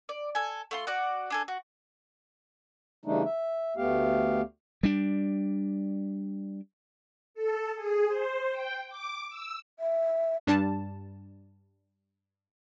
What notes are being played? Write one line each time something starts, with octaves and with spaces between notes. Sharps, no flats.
D5
A4 G#5
A3 F4 C6
F#4 D5 F#5
D4 G#4 A4
F#4
C#3 E3 G3 A3 D4 D#4
E5
D2 A3 B3 G4 F5
G3 D4
A4
G#4
C5
G5
D6
E6
E5
G2 G3 D4 A5